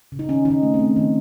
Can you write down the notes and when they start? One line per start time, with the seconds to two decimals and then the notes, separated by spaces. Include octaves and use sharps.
0.12 C#3
0.19 D#4
0.28 D#3 C#4
0.45 D#3 D#4
0.51 C#4
0.63 A3
0.74 C4
0.79 A3
0.96 D#3